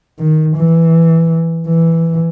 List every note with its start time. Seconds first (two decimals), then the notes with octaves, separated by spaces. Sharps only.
0.19 D#3
0.56 E3
1.67 E3